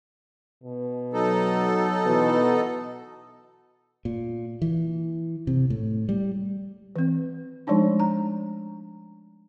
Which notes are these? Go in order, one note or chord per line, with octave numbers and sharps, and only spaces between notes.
B2
F#3 D#4 A4
B2 E3
A#2
E3
C3
A2
G3
E3 C4
F3 G#3 A3 D4 D#4
A#5